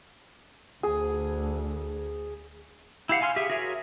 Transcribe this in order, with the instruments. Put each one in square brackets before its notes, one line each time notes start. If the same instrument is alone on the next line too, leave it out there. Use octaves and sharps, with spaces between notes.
[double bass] D2 [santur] G#4
[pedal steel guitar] E4 G4 F5 F#5
F5 G#5 C6 F6
G4 G#4 E5
F#4 G#4 A#4 C#5 E5